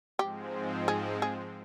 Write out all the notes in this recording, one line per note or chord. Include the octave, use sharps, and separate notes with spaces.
G#2 F3 G#3 C4 G4
G#4
G#4